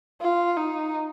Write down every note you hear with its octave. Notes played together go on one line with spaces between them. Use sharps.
F4
D#4